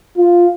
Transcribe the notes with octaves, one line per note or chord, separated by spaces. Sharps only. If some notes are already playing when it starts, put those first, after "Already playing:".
F4